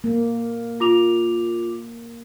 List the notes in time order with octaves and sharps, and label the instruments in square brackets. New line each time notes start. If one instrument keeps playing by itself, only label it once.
[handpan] A#3
[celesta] F4 D6 F7